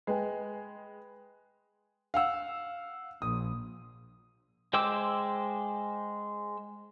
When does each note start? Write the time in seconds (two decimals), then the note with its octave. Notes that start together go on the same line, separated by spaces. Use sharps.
0.07 G#3 B4 G5 G#5
2.14 F5 F#5 E6
3.22 A#1 D#6
4.73 G#3 C5 G5 D6 E6